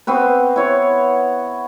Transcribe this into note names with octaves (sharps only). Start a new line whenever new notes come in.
B3 C4 F#4 B4
E4 C#5